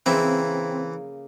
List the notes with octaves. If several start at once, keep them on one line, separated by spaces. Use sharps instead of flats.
C#3 E3 A#3 C4 E4